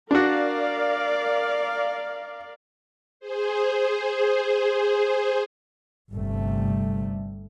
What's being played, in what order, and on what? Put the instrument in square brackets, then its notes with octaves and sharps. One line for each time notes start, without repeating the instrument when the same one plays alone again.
[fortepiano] D4 F#4 [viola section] A#4 D5 F5
[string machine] G#4 C5
[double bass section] G1 G2 C3 G3 A3